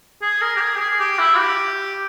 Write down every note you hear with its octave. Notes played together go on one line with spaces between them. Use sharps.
G#4
A#4
G4
G#4
G4
G#4
G4
E4
G4